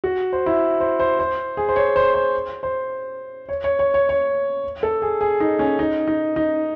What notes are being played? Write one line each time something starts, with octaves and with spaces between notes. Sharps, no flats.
F#4
C5
E4
C5
C5
C5
G#4
C5
C#5
C5
C5
C5
C#5
C#5
C#5
C#5
C#5
A4
G#4
G#4
D#4
C#4
D#4
D#4
D#4